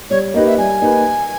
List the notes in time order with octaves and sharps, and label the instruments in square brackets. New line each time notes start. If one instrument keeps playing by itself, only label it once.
[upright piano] G3 [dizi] C#5
[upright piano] A#3 D#4 G4 B4 [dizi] D#5
[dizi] E5
[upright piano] G3 [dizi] G#5
[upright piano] A#3 D#4 G4 B4